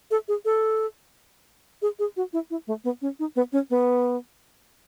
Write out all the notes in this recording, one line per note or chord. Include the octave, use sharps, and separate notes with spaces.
A4
G#4
A4
G#4
G#4
F#4
E4
E4
A3
B3
C#4
D#4
B3
C#4
B3